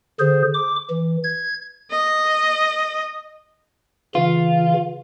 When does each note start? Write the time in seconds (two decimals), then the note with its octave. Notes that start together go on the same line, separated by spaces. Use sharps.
0.20 D3 G#4 C5
0.54 D6
0.90 E3
1.24 G#6
1.91 D#5
4.15 C#3 E3 F4